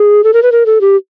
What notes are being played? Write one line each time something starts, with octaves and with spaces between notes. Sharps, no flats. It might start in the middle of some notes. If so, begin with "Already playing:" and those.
Already playing: G#4
A4
A#4
B4
A#4
A4
G4